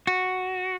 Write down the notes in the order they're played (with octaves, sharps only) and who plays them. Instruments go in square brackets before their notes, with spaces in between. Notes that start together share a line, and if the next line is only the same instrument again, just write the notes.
[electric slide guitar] F#4